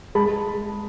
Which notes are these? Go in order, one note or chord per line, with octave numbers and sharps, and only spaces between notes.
G#3 A5 B5